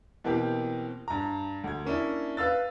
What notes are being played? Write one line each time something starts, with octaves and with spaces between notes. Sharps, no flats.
B2 E3 A#3 C4 G4
G2 A#5
D2 G#6
A#3 C#4 D4 E4
B4 F5 E6 A6